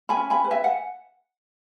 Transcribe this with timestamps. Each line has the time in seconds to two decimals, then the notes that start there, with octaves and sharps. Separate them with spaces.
0.09 G#5 B5
0.17 C#4
0.30 G#5 B5
0.44 B4
0.51 E5 G#5
0.64 F#5